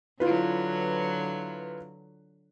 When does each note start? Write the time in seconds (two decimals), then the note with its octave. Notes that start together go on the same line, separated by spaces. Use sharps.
0.20 D3 F#3 E4 F4 B4